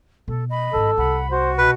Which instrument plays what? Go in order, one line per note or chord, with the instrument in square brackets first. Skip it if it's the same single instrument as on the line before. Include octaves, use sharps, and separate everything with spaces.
[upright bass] B2 [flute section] A4
[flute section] D#5 B5
[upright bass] G#1 G2 [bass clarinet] A4
[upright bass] C2 [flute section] F#5 B5
[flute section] F#4 [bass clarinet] C5
[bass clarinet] B2 [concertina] B4